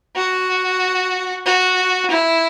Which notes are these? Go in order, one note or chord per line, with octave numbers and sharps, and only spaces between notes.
F#4
F#4
E4